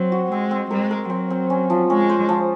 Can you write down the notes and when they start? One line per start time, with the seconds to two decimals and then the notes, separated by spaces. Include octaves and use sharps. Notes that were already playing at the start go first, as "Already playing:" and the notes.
Already playing: F#3 C4 C5
0.12 F#4
0.31 G#3 C4
0.51 C4
0.71 G#3 A#4
0.91 A#4
1.10 F#3 C4
1.30 C4
1.50 C#4
1.70 F3
1.90 G#3 C#4
2.09 C5
2.29 F3